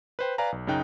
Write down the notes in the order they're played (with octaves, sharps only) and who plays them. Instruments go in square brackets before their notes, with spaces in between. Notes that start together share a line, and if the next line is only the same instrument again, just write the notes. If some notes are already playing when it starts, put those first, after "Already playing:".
[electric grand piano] B4 C5 G5
B4 D5 F5 G#5 A#5
B1
F#2 C#3 D#4 G5 F#6